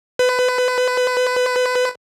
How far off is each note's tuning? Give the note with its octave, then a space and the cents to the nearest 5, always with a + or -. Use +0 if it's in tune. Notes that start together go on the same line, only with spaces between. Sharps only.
B4 +25